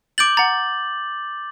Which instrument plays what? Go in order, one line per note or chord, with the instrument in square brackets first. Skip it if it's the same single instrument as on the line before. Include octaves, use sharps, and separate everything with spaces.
[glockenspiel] D6 G6 F#7 [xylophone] A6 D7
[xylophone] F#5 A#5 [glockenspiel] A6